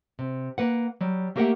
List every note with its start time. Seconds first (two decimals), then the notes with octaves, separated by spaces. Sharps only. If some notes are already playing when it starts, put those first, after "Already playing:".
0.19 C3
0.58 A#3 B4 F#5
1.01 F#3 G3
1.36 A3 A#3 G4 A#4 E5 F#5